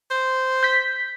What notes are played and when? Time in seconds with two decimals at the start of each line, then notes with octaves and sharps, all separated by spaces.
0.11 C5
0.63 G6 B6